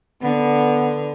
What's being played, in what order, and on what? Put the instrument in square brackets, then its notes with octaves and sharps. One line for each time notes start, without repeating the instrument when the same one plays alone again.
[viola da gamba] D3 [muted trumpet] B3